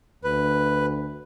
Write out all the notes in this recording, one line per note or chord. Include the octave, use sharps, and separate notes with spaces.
D2 B4